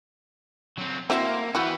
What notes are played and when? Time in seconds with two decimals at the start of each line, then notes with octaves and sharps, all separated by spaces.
0.78 F#3 C4
1.10 A#3 C4 E4 F#4 C5 E5 A5
1.55 E3 B3 E4 F#4 F#5 G5